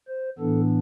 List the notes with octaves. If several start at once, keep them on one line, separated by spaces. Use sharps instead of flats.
C5
A2 E3 B3 D4 A4